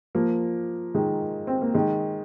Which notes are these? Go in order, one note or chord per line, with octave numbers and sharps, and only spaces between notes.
F3 A#3
D#3 G#3
C4
A#3
D#3 G#3